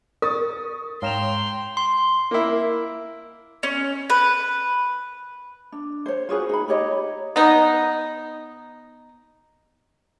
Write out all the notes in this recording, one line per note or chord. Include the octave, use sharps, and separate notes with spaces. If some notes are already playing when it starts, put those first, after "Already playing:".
A#4 C#6 D#6 A6
G#2 C#5 F5 G5 A#5 C6 E7 F7
C6
A#3 E4
C#4
B4
D4
C5 C#5
F4 F#4 G#4 B4
D#4 B5
D#4 G4 C#5 D#5
B3 D#4